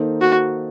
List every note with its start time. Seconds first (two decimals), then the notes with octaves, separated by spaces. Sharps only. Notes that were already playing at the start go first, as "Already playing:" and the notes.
Already playing: D#3 A#3 D#4 A4 C5
0.21 F#4